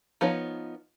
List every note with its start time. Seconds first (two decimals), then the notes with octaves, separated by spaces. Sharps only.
0.21 F3 B3 D#4 C#5